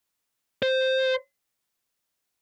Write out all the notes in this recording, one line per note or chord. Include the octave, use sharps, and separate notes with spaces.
C5